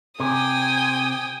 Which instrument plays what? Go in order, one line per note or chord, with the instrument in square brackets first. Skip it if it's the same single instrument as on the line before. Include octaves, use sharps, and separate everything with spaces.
[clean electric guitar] C3 [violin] G5 D#6 [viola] G#5